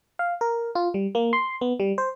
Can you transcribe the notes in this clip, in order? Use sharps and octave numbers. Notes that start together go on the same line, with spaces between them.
F5
A#4
F4
G3
A#3
C6
B3
G3
C5